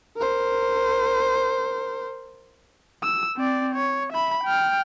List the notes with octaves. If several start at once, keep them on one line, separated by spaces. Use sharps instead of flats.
A#4 C5
E6
C4 D5
C#5
E5 B5
G5 F6